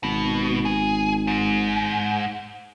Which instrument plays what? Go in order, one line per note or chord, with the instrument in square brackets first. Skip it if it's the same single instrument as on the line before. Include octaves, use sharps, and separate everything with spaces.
[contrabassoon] G#1 [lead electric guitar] B2
[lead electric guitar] G#4
G#2